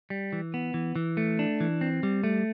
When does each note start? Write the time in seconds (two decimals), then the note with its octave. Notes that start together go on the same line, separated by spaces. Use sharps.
0.10 G3
0.33 E3
0.54 B3
0.74 E3
0.96 E3
1.17 A3
1.39 D4
1.60 E3
1.81 C4
2.03 G3
2.23 A3